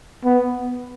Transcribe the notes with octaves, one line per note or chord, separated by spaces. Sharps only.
B3